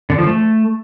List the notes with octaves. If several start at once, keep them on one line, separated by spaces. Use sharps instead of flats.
D3
F3
A3